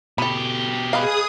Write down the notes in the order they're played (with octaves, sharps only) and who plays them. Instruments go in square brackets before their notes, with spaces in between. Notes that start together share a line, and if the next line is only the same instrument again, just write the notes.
[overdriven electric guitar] B2 G4 [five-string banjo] A4 B5
[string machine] G#4 D#6 [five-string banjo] B4 D#5 F5